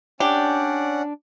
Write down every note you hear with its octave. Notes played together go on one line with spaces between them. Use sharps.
C#4 D4 G4 D5 F#5